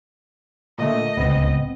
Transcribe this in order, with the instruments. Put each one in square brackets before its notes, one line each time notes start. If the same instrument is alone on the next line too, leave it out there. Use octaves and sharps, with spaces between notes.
[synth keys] A#2 D3 A3 [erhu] D#5
[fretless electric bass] D1 C#2 [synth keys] B3 C4